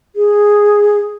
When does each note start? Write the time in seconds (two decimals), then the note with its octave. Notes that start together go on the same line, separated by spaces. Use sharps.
0.16 G#4